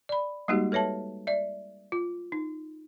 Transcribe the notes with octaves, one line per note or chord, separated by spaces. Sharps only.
D5 B5
G3 G#3 A#3 D#4 F#4 G4
A4 B4 C#5 E5 A5
D5 E5
F4
D#4